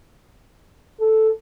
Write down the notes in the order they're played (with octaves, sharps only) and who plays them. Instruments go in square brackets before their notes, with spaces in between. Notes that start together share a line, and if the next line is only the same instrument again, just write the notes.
[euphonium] A4